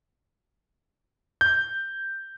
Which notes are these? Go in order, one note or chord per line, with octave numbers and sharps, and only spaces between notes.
G6